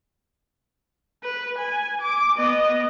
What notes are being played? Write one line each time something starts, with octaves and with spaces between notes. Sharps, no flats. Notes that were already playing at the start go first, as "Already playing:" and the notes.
B4
G#5
D6
B3 D#5